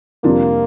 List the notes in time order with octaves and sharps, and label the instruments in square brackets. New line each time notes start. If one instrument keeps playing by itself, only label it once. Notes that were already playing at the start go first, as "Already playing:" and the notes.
[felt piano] F2 C3 G3 D4 F4 [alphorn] A#3